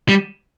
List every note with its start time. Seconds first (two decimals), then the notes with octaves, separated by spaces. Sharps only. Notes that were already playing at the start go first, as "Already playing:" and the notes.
0.09 G3